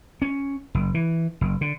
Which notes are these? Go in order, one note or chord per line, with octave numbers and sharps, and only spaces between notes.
C#4
F#1
E3
F#1
D3